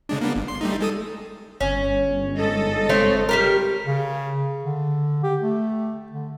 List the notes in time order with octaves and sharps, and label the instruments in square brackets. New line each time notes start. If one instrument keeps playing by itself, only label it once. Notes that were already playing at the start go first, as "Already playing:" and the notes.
[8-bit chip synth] C#3 G#3 D4
A#3 B3 D4
G1
C6
G3 A3 D#4
G#3 A4 D#6
[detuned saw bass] G1 [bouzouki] C#4
[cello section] G#2 A4 D#5
[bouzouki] A3 C4 C#5
G3 G4 A#4
[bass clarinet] C#3
D3
G4
A3
D3